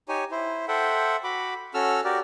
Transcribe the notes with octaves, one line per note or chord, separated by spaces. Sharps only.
D#4 G4 C#5 G#5
E4 C5
A4 C5 E5 F#5 G5
F#4 B5 D6
C#4 F#4 A4 E6 F6
F#4 G4 A#4 D5